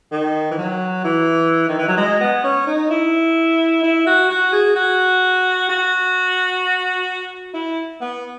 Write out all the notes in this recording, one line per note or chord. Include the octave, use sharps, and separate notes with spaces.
D#3
E3
F#3
E3
D#3
E3
F#3
G#3
B3
C#4
D#4
E4
E4
F#4
F#4
G#4
F#4
F#4
E4
B3